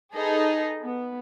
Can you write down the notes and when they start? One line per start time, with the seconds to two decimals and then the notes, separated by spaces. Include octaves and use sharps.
0.15 D#4 G#4 A4 B4 D#5
0.82 B3